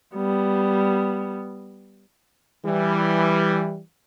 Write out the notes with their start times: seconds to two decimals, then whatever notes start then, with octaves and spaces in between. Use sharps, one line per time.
0.15 G3 B3
2.64 E3 G3